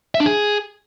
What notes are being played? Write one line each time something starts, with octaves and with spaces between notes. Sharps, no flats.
E5
D4
G#4